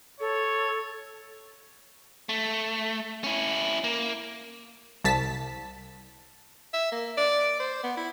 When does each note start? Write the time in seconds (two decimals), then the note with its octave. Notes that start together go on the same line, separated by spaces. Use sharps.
0.20 A4 C#5
2.29 A3
3.24 C#4 E4
3.84 A#3
5.04 C2 A5 B6
6.74 E5
6.92 A#3
7.17 D5
7.60 C5
7.84 B3
7.97 E4